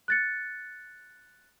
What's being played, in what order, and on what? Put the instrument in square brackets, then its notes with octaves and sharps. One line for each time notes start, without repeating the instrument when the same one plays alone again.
[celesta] F#6 A6 C#7